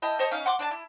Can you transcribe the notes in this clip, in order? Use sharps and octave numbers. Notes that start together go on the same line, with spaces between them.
E4 D#5 G5 A5
A4 C5 C#5 D#5
C#4 D#4 F5
F#5 C6 D6
D4 D5 G#5 A5
E4